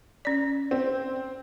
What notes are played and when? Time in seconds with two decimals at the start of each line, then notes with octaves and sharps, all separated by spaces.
0.25 C#4 D5
0.71 C4